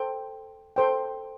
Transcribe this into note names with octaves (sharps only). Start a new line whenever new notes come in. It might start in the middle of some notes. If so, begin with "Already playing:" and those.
Already playing: A4 C5 G5
A4 C5 G5